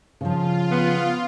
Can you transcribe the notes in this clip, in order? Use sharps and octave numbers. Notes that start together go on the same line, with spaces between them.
C#3 F3 F4
B3